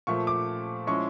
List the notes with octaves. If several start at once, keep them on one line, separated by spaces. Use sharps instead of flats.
A#2 F3 A3 C#6
D6
F3 G#3 C#4 E4 C#6